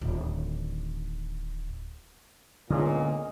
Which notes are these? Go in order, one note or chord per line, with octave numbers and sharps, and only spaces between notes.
D1 D#3
C#2 A#2 D3 B3 G#4 C#5 D#5